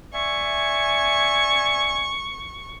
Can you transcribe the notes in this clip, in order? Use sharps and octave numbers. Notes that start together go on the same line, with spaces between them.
D5 E5 G#5 C#6